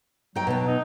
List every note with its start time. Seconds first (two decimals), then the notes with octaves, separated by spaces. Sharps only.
0.35 F#3 D#4 G5
0.47 B2 B3
0.67 D#4